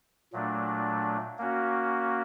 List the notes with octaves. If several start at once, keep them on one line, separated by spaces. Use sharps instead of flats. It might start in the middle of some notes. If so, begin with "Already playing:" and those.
A#2 F#3 A3 D4
A#3 C#4 F#4